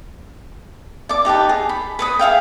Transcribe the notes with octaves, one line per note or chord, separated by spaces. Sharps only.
D5 D6
D#4 G4 B4 A5
G#4
B5
B4 B5 D#6
G#4 E5 F5 G5